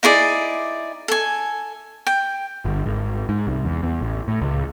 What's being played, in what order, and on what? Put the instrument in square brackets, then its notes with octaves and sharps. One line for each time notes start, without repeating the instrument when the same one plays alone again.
[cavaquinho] D#4 E4 G#4 D5
A4 G#5
G5
[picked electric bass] G1
G#1
G#2
C2
E2
E2
A1
A2
C#2